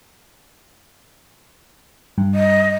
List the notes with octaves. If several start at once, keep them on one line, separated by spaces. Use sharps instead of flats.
G2
D#5